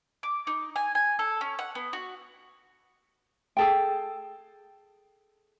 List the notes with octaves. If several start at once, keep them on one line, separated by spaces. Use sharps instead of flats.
D6
D#4
G#5
G#5
A4
C#4
F#5
B3
F#4
G#4 A4 G5